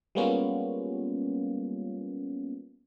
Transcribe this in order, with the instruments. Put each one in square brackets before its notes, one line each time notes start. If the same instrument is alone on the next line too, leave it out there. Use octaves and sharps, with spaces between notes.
[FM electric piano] G3 G#3 A#3 B3 C#4 F4